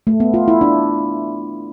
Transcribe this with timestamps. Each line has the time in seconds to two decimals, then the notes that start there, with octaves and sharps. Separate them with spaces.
0.07 A3
0.20 B3
0.34 F4
0.48 E4
0.61 D4